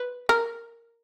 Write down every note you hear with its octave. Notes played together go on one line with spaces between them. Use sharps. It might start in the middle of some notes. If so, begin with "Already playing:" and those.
Already playing: B4
A#4